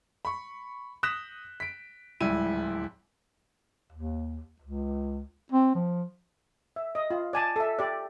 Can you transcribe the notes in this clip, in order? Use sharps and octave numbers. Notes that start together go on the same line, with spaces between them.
B5 C#6
D#6 F#6 G6 A#6 B6 E7
B6 D7
D1 C#2 G3 E4 D#7
D#2
C#2
C4
F3
E5
D#5
F4
D5 G#5 A5
A4 E5
G4 D5